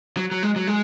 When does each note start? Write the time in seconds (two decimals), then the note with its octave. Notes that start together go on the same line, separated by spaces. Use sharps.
0.17 F#3
0.31 F#3
0.43 G#3
0.56 F#3
0.67 G#3